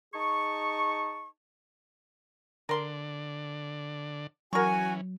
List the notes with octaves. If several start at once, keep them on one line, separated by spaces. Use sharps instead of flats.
D#4 G#4 A5 C#6
D3 A#4 D5 C6
E3 F#3 C#4 F#4 A#4 G#5 C#6